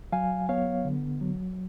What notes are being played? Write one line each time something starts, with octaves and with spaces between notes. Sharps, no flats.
F#3 F5 G#5
B3 C#5 F5
D3
F#3